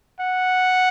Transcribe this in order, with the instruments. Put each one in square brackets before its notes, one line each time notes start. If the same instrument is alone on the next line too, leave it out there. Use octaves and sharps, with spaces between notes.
[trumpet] F#5